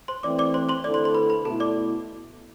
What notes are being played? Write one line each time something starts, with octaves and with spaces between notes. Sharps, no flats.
C5 C6
E3 A3 C4 D5 D6
D5 D6
C5 C6
C5 C6
D3 A3 C4 E4 A4 D5 D6
C5 C6
C5 C6
B4 B5
B4 B5
B2 A3 E4 A4 A5
D5 D6